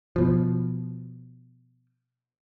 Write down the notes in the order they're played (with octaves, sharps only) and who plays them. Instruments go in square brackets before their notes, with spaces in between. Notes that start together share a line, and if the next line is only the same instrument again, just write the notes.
[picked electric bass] B2 F3